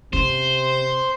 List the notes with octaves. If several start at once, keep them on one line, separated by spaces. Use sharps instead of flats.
C3 C#4 C5